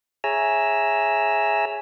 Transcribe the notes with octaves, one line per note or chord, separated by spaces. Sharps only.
G#4 C#5 E5 G#5 A#5 E6